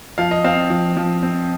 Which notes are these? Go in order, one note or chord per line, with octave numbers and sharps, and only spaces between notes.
F3 F5
D#5
C4 F5
F3
F3
C4